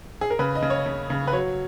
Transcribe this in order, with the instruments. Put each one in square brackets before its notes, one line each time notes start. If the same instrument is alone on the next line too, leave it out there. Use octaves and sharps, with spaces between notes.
[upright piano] G#4
A#4
C#3 B4
D#5
C#3
C#5
C#3
C#3
B4
F#3 C#5